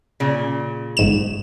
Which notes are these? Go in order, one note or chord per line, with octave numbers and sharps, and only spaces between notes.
A#2 C#3
G1 G#2 E7